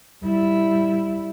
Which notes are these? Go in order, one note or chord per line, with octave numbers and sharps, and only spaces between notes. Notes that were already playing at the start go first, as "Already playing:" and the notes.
G3 E4